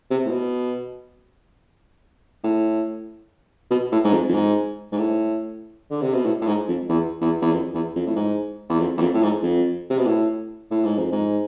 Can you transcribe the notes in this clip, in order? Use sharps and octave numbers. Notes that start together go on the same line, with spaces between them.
C3
A2
B2
A2
B2
A2
G#2
F2
F2
G#2
G#2
A2
D3
C3
B2
A2
A2
G#2
F2
E2
E2
E2
F2
E2
F2
A2
G#2
E2
F2
E2
F2
A2
G#2
F2
C3
B2
A2
A2
G#2
F2
G#2